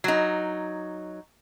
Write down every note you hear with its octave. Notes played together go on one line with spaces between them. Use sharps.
F#3 D#4